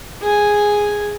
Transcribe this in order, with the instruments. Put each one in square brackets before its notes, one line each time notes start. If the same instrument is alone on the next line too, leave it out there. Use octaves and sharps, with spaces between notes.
[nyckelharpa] G#4 G#5